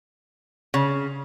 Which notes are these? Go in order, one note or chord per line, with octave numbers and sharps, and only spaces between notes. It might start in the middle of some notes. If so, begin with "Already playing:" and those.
C#3